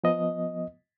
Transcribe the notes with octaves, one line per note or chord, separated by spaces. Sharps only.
F3 B3 D#5